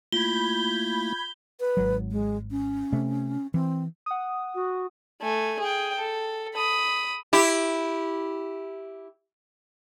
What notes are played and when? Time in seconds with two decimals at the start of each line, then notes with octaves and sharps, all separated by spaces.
0.12 A3 A#3 E4 F4 B5 G6 G#6 G7
1.60 B4
1.77 G#1 F#3
2.11 G#3
2.51 C#4
2.92 C3 A3
3.54 E3 C4
4.06 F#5 D#6
4.55 F#4
5.21 A3 G#5
5.60 G#4 G5
5.99 A4
6.56 B5 D#6
7.33 E4 G4